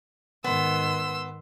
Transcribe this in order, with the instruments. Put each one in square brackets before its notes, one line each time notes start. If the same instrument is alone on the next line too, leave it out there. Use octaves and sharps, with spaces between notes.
[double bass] G#2 D#3 [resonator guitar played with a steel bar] B3 [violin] C6 E6